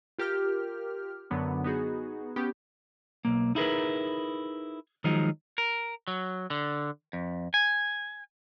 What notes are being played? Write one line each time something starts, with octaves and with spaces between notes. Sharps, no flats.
F4 G4 A#4 F6
F#2 D3 F#3 B3 D4
B3 D#4 F#4 G#4
B3 C#4 G4
B1 A#3
D#4 E4 G#4 A#4 B4
D#3 F3 F#3 G#3 D#4
A#4
F#3
D3
F2
G#5